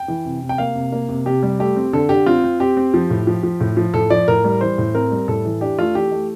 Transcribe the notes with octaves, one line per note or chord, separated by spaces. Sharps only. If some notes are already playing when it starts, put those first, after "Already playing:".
Already playing: G5
E3
C3
C3
G5
A#3 F5
C3
A#3
C3
C3 G4
G3
A3 G4
C4
D3 A4
D3 G4
C4 F4
C4
C4 G4
C4
F3
A2
F3
F3
A2
F3
A2 A4
F3 D5
A2 A#4
G3
E3 C5
A2
C4 A#4
G3
A2 A4
E3
D4 G4
A3 F4
E3 G4
A3